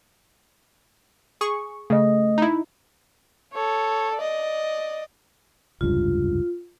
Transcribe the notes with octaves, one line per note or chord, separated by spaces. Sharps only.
G#4 C#6
C#3 A3 D#5
D#4 E4
A4 C#5
D5 D#5
F1 C#2 G2 F4